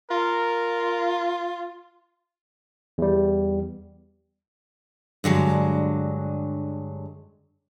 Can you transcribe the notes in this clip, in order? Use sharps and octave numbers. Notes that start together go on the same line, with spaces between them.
F4 A#4
E2 G3
G2 D3 F#3 G#3